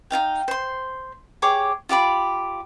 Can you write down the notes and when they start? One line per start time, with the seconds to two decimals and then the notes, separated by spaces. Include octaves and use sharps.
0.10 D#4 F4 F5 G5
0.48 C5 C6
1.42 G4 G#4 C#5 D6
1.89 F4 G4 D5 B5